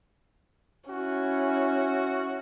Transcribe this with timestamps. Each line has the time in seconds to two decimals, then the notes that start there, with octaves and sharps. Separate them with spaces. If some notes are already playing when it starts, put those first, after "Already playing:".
0.90 C#4 E4 F#4